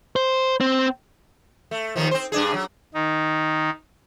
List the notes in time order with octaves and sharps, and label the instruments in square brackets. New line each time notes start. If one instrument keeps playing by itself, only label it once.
[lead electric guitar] C5
C4
[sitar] A3
D#2 D#3 F3
C4 C5
G2 D4 G#4
F#3
[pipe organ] D#3 D#4